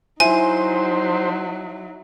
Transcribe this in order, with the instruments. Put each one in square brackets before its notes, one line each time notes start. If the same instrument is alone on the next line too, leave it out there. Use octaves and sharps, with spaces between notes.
[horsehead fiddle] F#3 D#4 [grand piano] E4 [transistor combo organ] C5 [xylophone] G#5